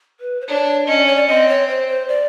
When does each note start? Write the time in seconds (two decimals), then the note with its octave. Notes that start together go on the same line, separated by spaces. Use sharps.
0.20 B4
0.41 C5
0.48 D4 C#5
0.87 C#4 D#5
0.97 D5
1.07 C#5
1.16 D5
1.28 C4 D#5
1.48 C#5
1.68 C5
1.88 C5
2.08 D5